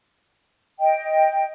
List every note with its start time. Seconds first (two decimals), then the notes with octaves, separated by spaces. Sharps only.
0.79 D#5 G5